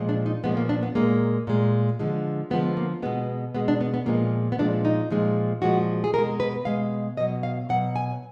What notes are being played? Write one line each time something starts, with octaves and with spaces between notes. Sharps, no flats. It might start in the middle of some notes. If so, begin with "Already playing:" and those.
Already playing: A#2 F3 G#3
D4
D#4
A#2 F3 G#3 B3
A#3
D4
B3
A#2 G#3 A#3
A#2 G#3
D3 F3 G#3
D3 F3 G#3 B3
A#3
B2 G#3 B3
B2 G#3 B3
D4
B3
B3
A#2 F3 G#3 A#3
B3
A#2 F3 G#3 D4
D#4
A#2 F3 G#3
A#2 F3 G#3 F#4
G#4
B2 A#4
G#3
B4
B2 G#3 F5
B2 F#3 D#5
F5
B2 F#3 F#5
G#5